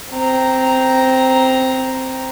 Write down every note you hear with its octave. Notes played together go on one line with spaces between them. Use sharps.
C4 A#5